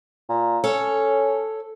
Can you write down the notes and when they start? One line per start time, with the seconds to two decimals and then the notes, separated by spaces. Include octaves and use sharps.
0.29 A#2
0.64 C#4 A4 C#5 A5